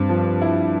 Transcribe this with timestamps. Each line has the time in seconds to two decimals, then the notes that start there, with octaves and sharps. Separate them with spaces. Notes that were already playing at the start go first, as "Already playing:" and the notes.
Already playing: G2 C4
0.09 F3
0.42 E4